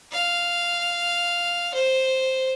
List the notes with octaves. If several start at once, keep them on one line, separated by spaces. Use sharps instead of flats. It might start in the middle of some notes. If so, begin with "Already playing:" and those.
F5
C5